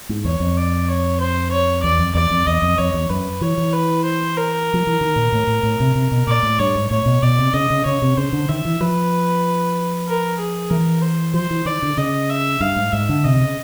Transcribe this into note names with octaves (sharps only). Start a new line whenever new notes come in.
G#2
E2 C#5
F2
D5
C#5
C5
C#5
E2 D5
F2
E2 D5
F2
E2 D#5
F2
F2 C#5
E2
F#2 B4
E3 C#5
E3
B4
C5
A#4
F3
E3
D#3
A#2
A2
A2
A2
C3
C3
B2
A#2 D5
A2
G2 C#5
G#2
A2 C#5
B2
B2 D5
C3
C#3 D#5
C#3
C#3 C#5
C3
C#3 C5
D3
D#3 E5
E3
F3 B4
A#4
G#4
E3 A#4
C5
F3 C5
E3
D#3 D5
D3
C#3 D#5
E5
G2 F5
G#2
G#2 E5
D3
C3 D#5
D3
C#3